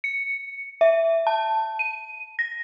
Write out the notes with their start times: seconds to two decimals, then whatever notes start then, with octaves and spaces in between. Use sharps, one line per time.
0.04 C#7
0.81 E5
1.27 A5
1.79 D#7
2.39 A#6